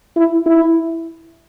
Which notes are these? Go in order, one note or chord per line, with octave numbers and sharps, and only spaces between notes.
E4
E4